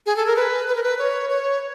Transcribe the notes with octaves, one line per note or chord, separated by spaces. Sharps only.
G#4
A4
A#4
B4
B4
A#4
B4
C#5
C#5